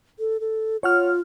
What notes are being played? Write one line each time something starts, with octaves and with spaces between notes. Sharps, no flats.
A4
A4
F4 C#5 F#5 F6